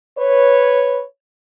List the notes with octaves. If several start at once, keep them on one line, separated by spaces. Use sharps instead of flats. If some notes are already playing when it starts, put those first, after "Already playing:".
B4 C#5